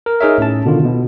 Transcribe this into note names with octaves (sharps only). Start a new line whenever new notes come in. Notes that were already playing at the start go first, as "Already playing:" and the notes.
A#4
D#4 G#4 A#4 C#5 E5
A2 C#4 A5
B2 D3 D#3 F4
B2